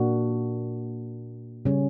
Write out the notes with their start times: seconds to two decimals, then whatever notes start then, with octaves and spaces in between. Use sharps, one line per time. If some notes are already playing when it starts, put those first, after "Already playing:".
Already playing: A#2 A#3 D4 F#4
1.65 C#3 G3 C#4